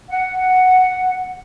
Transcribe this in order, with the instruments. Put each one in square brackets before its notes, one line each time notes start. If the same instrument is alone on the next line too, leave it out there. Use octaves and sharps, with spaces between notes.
[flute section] F#5